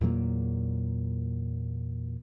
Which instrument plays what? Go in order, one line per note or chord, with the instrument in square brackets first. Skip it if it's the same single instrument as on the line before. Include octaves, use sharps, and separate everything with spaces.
[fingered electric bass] E2 A#2 F#3 A#3